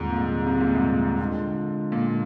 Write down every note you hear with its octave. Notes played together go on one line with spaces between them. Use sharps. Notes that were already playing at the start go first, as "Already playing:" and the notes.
Already playing: D#2 G#2 D3 G3 C4 F4
A#2
C3
A#2
G#2
A#2
D3 G#3 D4 F4
A#2